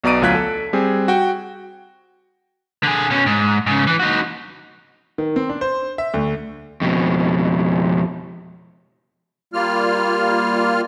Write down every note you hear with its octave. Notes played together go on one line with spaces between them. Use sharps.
B1 B2 D5 A#5 D7 D#7
D2 F#3 F4 F#6 G#6 B6
A4
G3 C4 G#4
F#4 G5
D3 G#4
B2 C#4
G#2
G#2 C#3
E3
D#4 F#4
D#3
C4
D4
C5
E5
D2
F2 B2
G3 A#3 F4 F6